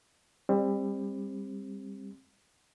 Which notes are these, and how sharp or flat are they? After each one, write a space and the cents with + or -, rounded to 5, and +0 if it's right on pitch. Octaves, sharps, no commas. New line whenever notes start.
G3 +30 C4 +25